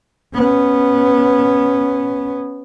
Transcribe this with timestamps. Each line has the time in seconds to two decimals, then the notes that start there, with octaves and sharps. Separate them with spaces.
0.35 B3 C#4